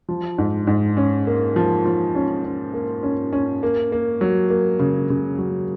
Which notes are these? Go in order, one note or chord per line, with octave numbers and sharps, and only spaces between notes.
F3
G#2
G#2
C#4
A#3
F3
F3
C#4
C#4
A#3
C#4
C#4
A#3
A#3
F#3
A#3
C#3
C#3
F#3